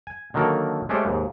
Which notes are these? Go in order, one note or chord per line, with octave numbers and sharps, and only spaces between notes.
G#5
D3 D#3 F#3 A#3 A4 A#4
G#3 A3 C#4 G4 C5 D5
D#2 G#2